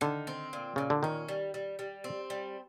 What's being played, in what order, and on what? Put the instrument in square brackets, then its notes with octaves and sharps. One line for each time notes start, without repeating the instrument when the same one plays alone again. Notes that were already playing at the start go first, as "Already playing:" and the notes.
[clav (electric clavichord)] D3 [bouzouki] D#3
[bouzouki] C4
A#2
[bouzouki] A#2 [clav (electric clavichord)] C#3
[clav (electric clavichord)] D3
[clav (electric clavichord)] D#3 [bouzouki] C#4
[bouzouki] G3
G3
G3
C4
G3